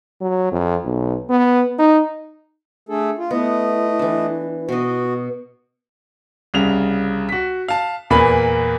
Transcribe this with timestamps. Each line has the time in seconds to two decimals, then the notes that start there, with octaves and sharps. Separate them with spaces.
0.21 F#3
0.52 F2
0.84 B1
1.30 B3
1.79 D#4
2.89 A3 D4 G#4 A4
3.18 F4
3.31 A3 B3 E4 D#5
3.99 E3 D4
4.69 B2 F#4 D#5
6.54 C2 C#3 F7
7.29 F#4 B6
7.68 F5 A5
8.10 E2 A#2 A#3 B4 B5